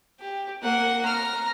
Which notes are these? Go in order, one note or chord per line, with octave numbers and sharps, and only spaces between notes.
G4
A#3 F#5
A#5 F6